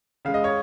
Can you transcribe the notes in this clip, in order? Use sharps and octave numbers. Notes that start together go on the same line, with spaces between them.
C#3 G#3 F5
D#5
C#5